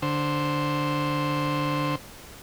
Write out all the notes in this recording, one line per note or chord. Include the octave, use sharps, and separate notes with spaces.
D3 C5